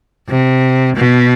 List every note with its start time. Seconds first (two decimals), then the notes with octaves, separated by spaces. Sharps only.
0.28 C3
0.96 B2